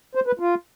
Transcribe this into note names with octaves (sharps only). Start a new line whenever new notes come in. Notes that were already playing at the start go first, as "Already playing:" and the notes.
C5
B4
F4